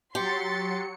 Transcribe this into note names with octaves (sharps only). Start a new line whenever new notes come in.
F#3 G4 C6 A6 C#7